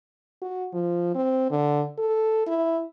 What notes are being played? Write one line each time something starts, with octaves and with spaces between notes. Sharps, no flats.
F#4
F3
C4
D3
A4
E4